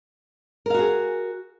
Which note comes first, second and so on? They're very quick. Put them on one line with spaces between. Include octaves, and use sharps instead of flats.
A#4 F5 F#4 G#4